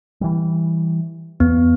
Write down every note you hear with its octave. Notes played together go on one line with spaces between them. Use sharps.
E3 G3
E2 B3